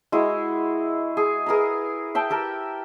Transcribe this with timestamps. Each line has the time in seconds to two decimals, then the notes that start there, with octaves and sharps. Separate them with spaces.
0.12 G#3 E4 F#4
1.17 G#4
1.46 G#4 A#4 B4 A#5
2.15 E5 G5 A5
2.30 G4 A#4 A5